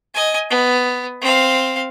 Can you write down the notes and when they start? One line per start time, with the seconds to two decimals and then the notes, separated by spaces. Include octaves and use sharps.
0.14 D#5 G#5
0.50 B3
1.22 C4 F5